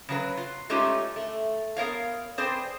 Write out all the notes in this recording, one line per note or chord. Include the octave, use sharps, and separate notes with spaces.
C#3 F#3 B4
F4
G#3 A3 C#4 D#4 F4 G4
A3
B3 A#4 C#5 F5
C4 G#4 B4 C5 D5